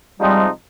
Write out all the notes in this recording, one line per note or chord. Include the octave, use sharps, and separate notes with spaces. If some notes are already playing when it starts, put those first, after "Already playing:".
C3 F3 G3 G#3 C4 D#4